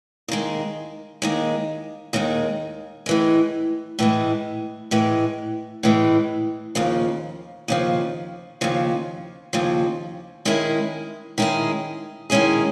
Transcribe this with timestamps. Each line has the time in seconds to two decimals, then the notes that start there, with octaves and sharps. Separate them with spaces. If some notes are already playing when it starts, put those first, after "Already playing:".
0.28 D#2 D#3 G#3
1.22 D#2 D#3 G#3
2.13 D#2 D#3 G#3
3.06 A2 E3 G#3
3.99 A2 E3 G#3
4.91 A2 E3 G#3
5.83 A2 E3 G#3
6.75 D#2 C#3 F3
7.68 D#2 C#3 F3
8.61 D#2 C#3 F3
9.53 D#2 C#3 F3
10.45 D#3 G#3 C#4 E4 G#4
11.38 D#3 G#3 C#4 E4 G#4
12.30 D#3 G#3 C#4 E4 G#4